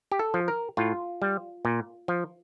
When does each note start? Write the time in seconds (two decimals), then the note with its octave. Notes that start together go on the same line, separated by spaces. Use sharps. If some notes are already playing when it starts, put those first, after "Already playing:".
0.12 G4
0.19 A4
0.34 F3
0.48 A#4
0.77 A2 F4
1.22 G3
1.65 A#2
2.08 F3